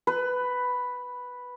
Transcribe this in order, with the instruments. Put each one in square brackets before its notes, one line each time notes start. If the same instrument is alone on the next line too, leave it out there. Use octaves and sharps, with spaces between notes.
[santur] B4